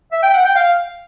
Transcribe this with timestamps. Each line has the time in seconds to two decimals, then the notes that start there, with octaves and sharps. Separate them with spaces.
0.12 E5
0.23 G5
0.34 F#5
0.45 G5
0.56 F5